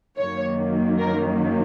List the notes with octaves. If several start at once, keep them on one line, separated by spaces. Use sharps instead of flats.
F#2 D#3 F#3 A#3 C#5
A#4